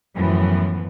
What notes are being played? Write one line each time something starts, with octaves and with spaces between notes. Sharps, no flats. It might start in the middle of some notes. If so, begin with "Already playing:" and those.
F#2 A2 E3 F3 B3